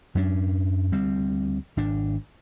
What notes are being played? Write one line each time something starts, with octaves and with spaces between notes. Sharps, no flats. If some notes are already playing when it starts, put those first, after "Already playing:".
F#2 F#3 C#4 D4
D2 G3 C4
G#1 D4